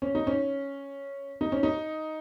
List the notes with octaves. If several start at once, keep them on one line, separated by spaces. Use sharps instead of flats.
C#4
D#4
C#4
D#4
C#4
D#4